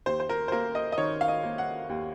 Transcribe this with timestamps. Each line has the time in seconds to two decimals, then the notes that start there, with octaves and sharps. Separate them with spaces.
0.06 D#2 C5
0.20 C5
0.29 A#4
0.48 C5
0.52 A#3 A#4
0.75 D#5
0.92 D#5
0.98 D#3 C#5
1.21 F5
1.28 D#5
1.43 A#3
1.58 F#5
1.89 D#2